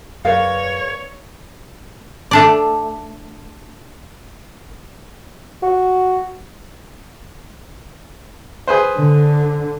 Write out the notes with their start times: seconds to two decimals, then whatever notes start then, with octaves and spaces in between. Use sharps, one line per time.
0.25 F#2 G#4 A#4 B4 C#5 D5 F5
2.31 A3 D4 D5
5.62 F#4
8.67 G#4 B4 C5
8.97 D3